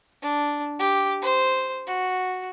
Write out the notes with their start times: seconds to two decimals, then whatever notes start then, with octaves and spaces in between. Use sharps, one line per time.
0.22 D4
0.79 G4
1.22 C5
1.87 F#4